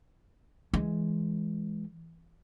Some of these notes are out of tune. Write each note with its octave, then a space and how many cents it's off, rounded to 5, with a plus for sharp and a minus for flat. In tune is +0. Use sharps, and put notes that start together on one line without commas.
E3 +0 G#3 +5